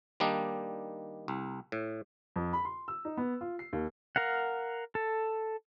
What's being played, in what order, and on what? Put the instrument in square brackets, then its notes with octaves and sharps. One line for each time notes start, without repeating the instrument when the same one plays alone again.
[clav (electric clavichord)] D#3 G3 A#3 D4 D#4
C2
A2
[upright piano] F2
B5
C6
E6
D#4
B3
F4
C7
D#2
[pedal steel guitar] A#4 F5 F#5
A4